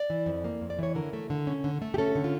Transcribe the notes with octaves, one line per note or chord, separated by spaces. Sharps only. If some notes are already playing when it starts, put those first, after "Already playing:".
Already playing: D5
E3
F2
A#3
F2
D5
E3 C#5
D3 A#4
A3
D3
C#4
D3
A3
G4
C#4 A4
D3
F4